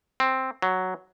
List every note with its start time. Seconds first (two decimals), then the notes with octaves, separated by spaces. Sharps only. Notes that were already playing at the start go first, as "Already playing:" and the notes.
0.20 C4
0.62 F#3